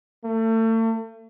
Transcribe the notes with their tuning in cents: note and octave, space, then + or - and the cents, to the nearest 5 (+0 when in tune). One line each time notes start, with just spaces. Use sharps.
A3 +35